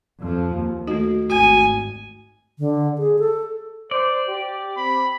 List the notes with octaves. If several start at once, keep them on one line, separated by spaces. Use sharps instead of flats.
F2 F3
D#2
D#3 A3 D#4 F#4
G#1 F#4 G#5
D3
G#4
A4
C5 D5
G4
C4 B5